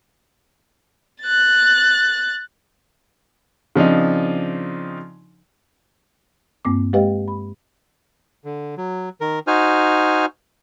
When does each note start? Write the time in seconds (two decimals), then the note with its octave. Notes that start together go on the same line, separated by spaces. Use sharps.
1.23 F#6 A6
3.75 C#3 F3 C4 D4 D#4
6.65 G2 A#3 C4 D6
6.93 G#3 G4 B4 D#5 F5 G5
7.28 B5
8.45 D3
8.77 F#3
9.21 D#3 A#4
9.47 D#4 F#4 C5 G#5 F6